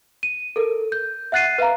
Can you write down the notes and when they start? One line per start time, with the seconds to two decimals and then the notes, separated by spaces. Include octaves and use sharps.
0.23 D#7
0.56 A4 A#4
0.92 G6
1.32 E5 F#5 F#6 A6 C7 D#7
1.58 B4 E5 F5 A#5